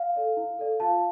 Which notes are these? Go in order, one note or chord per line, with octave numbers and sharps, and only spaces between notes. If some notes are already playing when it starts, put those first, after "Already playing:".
Already playing: F5
A4 D5
E4
A4 D5
F4 F5 A5